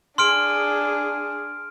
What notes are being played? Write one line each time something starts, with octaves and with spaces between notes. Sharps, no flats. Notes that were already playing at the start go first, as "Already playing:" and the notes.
D4 G#4 C6 F6 D7